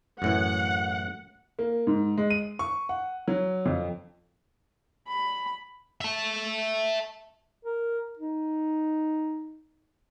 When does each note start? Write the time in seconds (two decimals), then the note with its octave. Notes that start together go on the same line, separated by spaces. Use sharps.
0.22 F#2 A2 E3 F#5
1.59 A#3
1.87 G#2
2.17 G#3
2.30 D#7
2.59 C#6
2.89 F#5
3.28 F#3
3.66 F2
5.08 B5
6.01 E5 A5
7.65 A#4
8.19 D#4